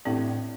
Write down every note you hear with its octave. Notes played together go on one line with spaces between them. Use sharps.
A1 A2 A3 C4 D4 G4